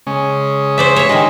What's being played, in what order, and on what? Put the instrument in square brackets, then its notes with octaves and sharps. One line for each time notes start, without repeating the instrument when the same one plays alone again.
[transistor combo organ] C#3 G#3 C#4
[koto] C5 D5 E5
C#5 E5
[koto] D#3 G#3 [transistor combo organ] D#4 G4